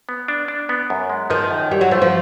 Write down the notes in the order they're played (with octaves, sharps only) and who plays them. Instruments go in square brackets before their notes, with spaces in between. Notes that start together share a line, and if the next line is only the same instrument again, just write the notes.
[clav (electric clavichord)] B3
D4
D4
B3
F#2
G#3
[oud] D#3 [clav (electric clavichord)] F3
[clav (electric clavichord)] F#2
[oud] G3 [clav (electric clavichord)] E4
[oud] F#3
[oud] F3 [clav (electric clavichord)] A3
[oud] F3